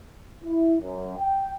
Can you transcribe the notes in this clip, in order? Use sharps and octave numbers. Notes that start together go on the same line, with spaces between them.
E4
F#2
G5